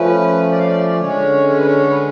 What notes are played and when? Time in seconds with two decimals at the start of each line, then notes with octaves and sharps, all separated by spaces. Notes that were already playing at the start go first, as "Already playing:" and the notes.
Already playing: F3 A3 C#4 B4
0.51 D5
0.59 F5
0.67 D5
1.00 D3 G#3 C#4 C#5
1.49 C#5
1.58 B4
1.66 C#5
1.79 A4
1.89 B4